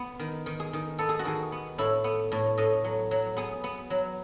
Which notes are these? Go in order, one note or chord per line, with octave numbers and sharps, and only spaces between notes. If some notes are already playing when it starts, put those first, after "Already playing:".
Already playing: B3
D#3
D#3
G#4
D#3
B3 A4
G#4
F#4
D#3 G#4
B3
A2 E4
B3
A2
A2 D#5
F#3
F#3
B3 G#4
B3
F#3